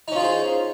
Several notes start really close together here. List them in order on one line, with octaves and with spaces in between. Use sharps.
D#4 C#4 F4 G#4 C5